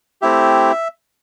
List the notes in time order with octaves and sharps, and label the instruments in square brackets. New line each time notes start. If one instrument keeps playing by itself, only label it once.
[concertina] A3 C4 E4 G4 E5